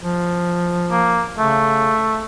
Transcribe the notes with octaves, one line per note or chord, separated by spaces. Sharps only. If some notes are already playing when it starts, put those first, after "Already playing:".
F3
A#3
C#3 A3